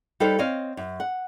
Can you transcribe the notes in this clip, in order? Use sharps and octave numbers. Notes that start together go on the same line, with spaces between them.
G3 D#4 A4 B4 C5 F5
C4 C#5 D#5 F5
F#2
F#5